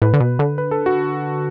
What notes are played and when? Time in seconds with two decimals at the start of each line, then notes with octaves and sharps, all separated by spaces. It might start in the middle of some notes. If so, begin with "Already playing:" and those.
0.02 A2 B4
0.14 D3
0.20 B2
0.39 D3
0.58 B4
0.71 A4
0.86 F#4